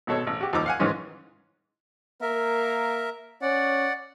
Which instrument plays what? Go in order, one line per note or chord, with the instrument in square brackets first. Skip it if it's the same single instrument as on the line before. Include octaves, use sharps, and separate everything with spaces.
[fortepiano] G#1 B2 A4 C#5
A1
F#4 G4
D#2 F3 D#4 A#5 D6 E6
F5 F#5 G#5
G#2 D#3 E3 G#3 C#4 F4
[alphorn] A#3 [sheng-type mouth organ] A#4 E5
[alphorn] C#4 [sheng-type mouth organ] D5 F#5